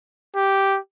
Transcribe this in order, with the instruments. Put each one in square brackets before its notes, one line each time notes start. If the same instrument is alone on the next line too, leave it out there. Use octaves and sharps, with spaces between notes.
[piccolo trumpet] G4